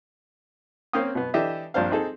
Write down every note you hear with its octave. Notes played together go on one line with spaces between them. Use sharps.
A#3 C4 C#4 F5 G5 D#6
B2 B3
E3 D4 G4 A4 D#5 E5
A#1 G2 D4 C5 F5
C4 D#4 G#4 A4